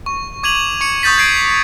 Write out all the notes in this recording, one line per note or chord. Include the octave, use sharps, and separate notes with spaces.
C#6
D6 G#6 D#7 F7 F#7
C#6 C#7 D#7
C#6 D#6 G6 A6 B6
G#6 C7 D7